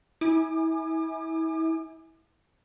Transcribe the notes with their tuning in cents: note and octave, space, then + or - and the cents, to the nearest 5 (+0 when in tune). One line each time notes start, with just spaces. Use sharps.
E4 -35 G#5 +0 D6 +40